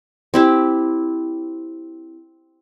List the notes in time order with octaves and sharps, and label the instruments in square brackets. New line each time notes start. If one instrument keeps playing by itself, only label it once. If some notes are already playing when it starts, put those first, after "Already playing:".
[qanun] C4 E4 G4